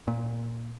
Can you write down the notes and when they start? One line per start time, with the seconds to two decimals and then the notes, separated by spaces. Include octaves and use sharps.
0.08 A#2